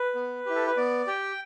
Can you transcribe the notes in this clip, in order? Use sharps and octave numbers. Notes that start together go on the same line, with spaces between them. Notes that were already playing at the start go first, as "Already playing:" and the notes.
Already playing: B4
B3
E4 G4
A4
B4
B3 D5
G4 G5